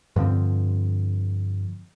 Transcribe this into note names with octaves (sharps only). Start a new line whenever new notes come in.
G2 D3 F3 C4